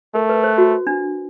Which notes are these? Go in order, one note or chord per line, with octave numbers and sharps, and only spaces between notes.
A3 A#4
B4
C5
F#4
D4